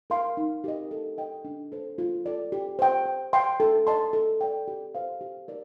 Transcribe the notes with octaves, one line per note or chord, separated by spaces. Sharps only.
A#4 F5 C6
D#4
G4 A#4 D#5
A4
D#5 G5
D4
A4 C5
F4
A4 D5
G4
C5 G5
C5
G5 C6
A4
D#5 A5 C6
A4
D5 G5
G4
C5 F5
G4
A#4 D5